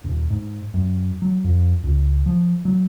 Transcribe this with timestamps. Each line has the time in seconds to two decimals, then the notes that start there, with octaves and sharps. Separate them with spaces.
0.04 D#1
0.30 G#2
0.74 F#2
1.22 F#3
1.44 F2
1.84 C#2
2.26 F3
2.65 F#3